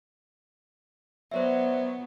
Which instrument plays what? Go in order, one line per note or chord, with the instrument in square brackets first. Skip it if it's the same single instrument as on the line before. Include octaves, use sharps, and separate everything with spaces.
[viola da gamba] F#3 B3 [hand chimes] C5 D5 E5